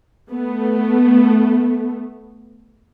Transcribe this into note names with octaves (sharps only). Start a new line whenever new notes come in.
A3 B3